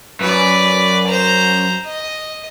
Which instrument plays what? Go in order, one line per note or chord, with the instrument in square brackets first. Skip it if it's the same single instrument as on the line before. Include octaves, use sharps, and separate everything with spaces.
[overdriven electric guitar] F#2 [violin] B4 D5
[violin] C5 A#5
D#5